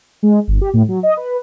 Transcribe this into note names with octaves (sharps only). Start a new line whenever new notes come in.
G#3
G1
G4
A2
F#3
D#5
B4